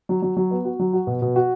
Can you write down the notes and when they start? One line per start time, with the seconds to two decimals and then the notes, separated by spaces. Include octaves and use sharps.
0.09 F#3
0.22 F#3
0.37 F#3
0.51 B3
0.65 F#4
0.80 F#3
0.93 F#4
1.07 B2
1.22 B2
1.36 F#4